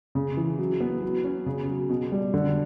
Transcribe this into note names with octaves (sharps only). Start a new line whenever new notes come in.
C#3
E3
F#3
B3
F#3
C#4
C#3
F#3
B2
G3
D3